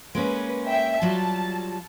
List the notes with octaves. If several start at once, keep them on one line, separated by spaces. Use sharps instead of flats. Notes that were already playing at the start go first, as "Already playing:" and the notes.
G#3 A#3 C#4 B4
E5 G5
F#3 G3 F4 A5